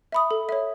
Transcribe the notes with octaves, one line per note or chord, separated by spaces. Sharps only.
E5 B5 D#6
A4
C#5 E5